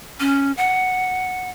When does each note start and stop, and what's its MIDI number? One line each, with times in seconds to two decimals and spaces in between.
0.20 0.52 61
0.57 1.50 78